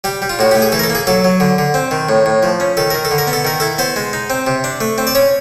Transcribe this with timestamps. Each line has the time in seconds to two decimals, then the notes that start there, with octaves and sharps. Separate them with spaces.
0.04 G3 G4
0.22 G3
0.29 F4
0.39 A2 F#4
0.51 A3 G4
0.62 G#4
0.72 E3 A4
0.79 A#4
0.83 A4
0.90 A#3
0.95 G#4
1.07 F#3 A4
1.24 F#3
1.40 D3
1.58 D3
1.74 C4
1.91 D#3
2.09 A2
2.26 A2
2.43 F3
2.60 C#4
2.77 D#3 A4
2.90 D#3 A#4
3.05 A4
3.11 D3
3.18 A#4
3.27 B3
3.33 A4
3.45 D#3 A#4
3.60 E4 A4
3.78 B3 C5
3.96 G#3
4.13 D#4
4.30 C4
4.47 C3
4.64 D4
4.81 A3
4.98 C4
5.07 D5
5.15 C#4 C#5